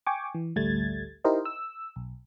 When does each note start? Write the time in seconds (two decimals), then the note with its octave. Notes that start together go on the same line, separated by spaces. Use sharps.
0.07 G5 G#5 C#6 D6
0.34 E3
0.56 A1 D2 G3 A3 G#6 A6
1.24 D#4 E4 G4 A#4 C5 D#5
1.45 E6
1.96 B1